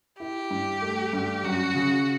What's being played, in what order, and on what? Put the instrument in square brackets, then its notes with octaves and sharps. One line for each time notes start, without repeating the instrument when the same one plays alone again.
[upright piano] E4 [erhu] G4
[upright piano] G2
A3
G2
[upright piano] F#2 [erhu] F#4
[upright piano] C#3